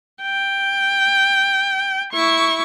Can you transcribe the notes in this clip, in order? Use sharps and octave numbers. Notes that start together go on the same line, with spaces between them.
G5
E4 C#6